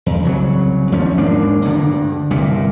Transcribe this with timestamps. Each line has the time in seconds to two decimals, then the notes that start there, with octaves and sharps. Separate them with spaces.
0.06 E2
0.23 C2 C#3 F#3
0.92 D#2 F3 C#4
1.18 E1 G#2 A#3 D4
1.65 D2 G2 D3
2.31 G1 C2 A#2